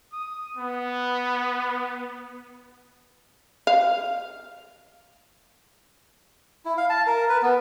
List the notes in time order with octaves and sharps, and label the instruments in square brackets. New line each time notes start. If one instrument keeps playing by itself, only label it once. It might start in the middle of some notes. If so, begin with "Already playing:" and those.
[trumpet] D#6
B3
[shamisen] F5
[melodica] E4
F5
A5
A#4
B4
B3